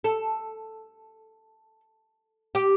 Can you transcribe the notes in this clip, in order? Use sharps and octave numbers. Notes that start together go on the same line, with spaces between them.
A4
G4